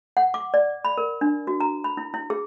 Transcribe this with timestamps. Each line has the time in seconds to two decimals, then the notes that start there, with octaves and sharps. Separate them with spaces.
0.17 F#5
0.34 D6
0.54 D5
0.85 B5
0.98 A#4
1.21 D4
1.47 F#4
1.60 A#5
1.84 B5
1.97 E4
2.14 E4
2.30 G#4